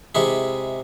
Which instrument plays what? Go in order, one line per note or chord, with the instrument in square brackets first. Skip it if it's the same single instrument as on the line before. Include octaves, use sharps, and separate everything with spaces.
[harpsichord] C3 G#3 E4